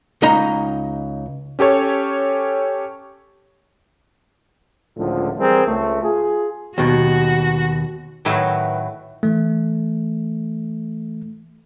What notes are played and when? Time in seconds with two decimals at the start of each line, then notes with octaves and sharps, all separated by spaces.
0.22 C#2 D#4 D#5 A#5
1.59 C#4 G4 A4 C#5
4.97 C#2 A2 D3 F3
5.38 E3 G3 C4 G#4 A#4
5.68 C#2 A3
6.03 F4 G#4
6.78 D#2 B2 F#4
8.25 A2 D#3 F#3 B4 E5
9.23 E3 A3